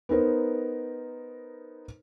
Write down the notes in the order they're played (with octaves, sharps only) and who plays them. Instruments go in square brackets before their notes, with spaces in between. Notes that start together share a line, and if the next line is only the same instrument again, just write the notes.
[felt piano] B3 D#4 A#4 C5